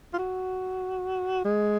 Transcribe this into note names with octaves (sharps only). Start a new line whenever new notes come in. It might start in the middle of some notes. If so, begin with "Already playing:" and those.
F4
F#4
G#3